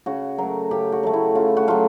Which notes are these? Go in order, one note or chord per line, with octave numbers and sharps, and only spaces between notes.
C#3 F#4
F#3 A3 A#4
C#3 G4
F#4
F#3 A3
E4
C#3 F4
F#4
F#3 A3 F4